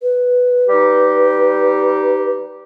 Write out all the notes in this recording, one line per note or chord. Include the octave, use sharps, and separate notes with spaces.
B4
G3 D#4 G4